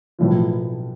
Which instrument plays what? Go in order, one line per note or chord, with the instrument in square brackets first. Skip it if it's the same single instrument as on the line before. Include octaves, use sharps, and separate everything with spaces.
[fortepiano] B1 A2 F3